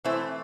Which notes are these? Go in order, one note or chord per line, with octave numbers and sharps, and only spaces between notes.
E3 A3 C4 E4